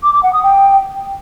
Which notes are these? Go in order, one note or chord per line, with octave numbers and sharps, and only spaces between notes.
D6
D6
F#5
D#6
G5